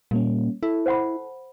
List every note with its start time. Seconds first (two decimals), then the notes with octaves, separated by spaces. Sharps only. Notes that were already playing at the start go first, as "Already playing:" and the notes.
0.11 A#2 G3 A#3 C#4
0.63 E4 A4
0.86 C5 F#5 B5